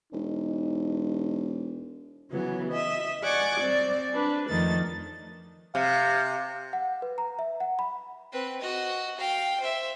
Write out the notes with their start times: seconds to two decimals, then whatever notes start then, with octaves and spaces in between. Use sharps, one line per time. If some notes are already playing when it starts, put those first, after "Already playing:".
0.13 E1 D#4
2.30 C#3 E3 F#3 B3
2.70 D#5 E5
3.22 D5 F#5 G#5 C#6 D6
3.57 G3 C4 D5
4.13 D4 B4
4.48 F2 D#3 F3 A3 A6
5.75 C3 F5
6.73 F#5
7.02 B4
7.18 A#5
7.39 E5
7.60 F#5
7.79 B5
8.32 C4 B4
8.61 F#4 D#5
9.18 F5 G5
9.60 C5 E5